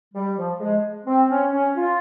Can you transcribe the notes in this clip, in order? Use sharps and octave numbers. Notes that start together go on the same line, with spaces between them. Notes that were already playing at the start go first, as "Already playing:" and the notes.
G3
F3
G#3
C4
C#4
C#4
F4